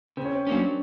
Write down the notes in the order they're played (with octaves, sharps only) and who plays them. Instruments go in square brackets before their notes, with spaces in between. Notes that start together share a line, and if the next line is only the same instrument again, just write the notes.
[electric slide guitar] C#3 [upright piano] C4
[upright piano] C#4
C4
[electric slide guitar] F#3 A#3 C#4 [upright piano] D4